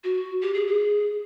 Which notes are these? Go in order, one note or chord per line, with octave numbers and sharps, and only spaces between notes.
F#4
G4
G#4
G#4